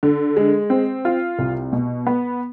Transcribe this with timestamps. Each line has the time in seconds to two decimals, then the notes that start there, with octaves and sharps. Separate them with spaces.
0.03 D3
0.37 G#3
0.70 C4
1.05 F4
1.39 C2
1.73 B2
2.07 B3